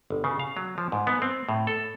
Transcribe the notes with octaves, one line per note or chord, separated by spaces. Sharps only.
G1
C#3
F5
F#3
F3
G#2
B3
C4
A2
A4